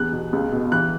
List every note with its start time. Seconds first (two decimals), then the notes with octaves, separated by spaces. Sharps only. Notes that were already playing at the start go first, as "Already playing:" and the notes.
Already playing: E2 F#6
0.12 B2
0.33 C#2
0.52 B2
0.72 E3 F#6